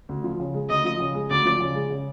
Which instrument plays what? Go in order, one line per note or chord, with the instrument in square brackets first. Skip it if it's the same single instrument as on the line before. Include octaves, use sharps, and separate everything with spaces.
[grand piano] D2
F3
C#3
G#3
[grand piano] D2 [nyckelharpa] D#5
[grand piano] F3
C#3
G#3
[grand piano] D2 [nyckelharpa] D5
[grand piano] F3
C#3
G#3
C#3